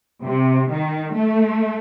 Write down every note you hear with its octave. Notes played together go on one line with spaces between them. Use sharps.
C3
D#3
A3